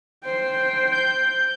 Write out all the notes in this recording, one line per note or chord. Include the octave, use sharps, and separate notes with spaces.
C5 G5
G6